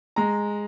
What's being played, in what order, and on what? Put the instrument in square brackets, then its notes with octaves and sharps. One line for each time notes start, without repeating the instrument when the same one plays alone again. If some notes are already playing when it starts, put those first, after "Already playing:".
[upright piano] G#3 A#5